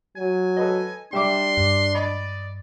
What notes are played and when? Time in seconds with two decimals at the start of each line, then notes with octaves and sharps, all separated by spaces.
0.17 F#3 G#5
0.56 A4 B4 D#5
1.13 G3 D4 E5 C6 D6
1.57 G2
1.95 D5 D#5 B5